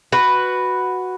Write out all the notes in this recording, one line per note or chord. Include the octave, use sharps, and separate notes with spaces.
F#4 B4